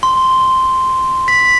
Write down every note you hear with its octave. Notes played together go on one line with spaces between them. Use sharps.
C6
B6